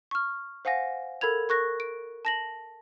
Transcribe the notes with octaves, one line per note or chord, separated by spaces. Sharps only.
C#6 F6
C5 F5 F#5 G#5 A#6
A4 A#4 B5 G#6 F7
A#4 C#6 F#6 A#6
D7
A5 A#6 F#7